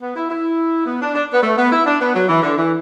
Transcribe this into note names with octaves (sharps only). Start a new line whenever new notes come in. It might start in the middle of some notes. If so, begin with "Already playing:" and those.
B3
E4
E4
B3
D4
D4
B3
A3
B3
E4
D4
B3
F#3
E3
D3
E3